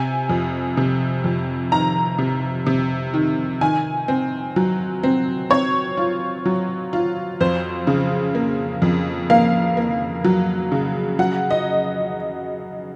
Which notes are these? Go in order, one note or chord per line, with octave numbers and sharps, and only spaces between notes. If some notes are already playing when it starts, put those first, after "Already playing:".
Already playing: C3 G#5
F2
C3
F2
D#3 A#5
C3
C3
D#3
D#3 G#5
C4
F#3
C4
C4 C#5
F4
F#3
F4
F2 C5
C#3
A#3
F2
A#3 F5
A#3
F#3
C#3
F#3 F#5
D#5